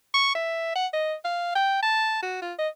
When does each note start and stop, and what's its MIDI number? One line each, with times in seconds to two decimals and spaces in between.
0.14 0.34 85
0.35 0.75 76
0.75 0.86 78
0.93 1.14 75
1.25 1.52 77
1.55 1.78 79
1.83 2.22 81
2.23 2.40 66
2.42 2.53 65
2.59 2.68 75